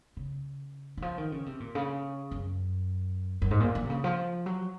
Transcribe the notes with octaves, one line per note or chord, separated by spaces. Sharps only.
C#3
D#3
F3
D#3
C#3
C3
A#2
C#3
F#2
F#2
G#2
A#2
F3
C3
C#3
F3
F#3